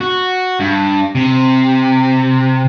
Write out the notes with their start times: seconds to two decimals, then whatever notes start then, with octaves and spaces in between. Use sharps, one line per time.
0.01 F#4
0.60 G2
1.15 C3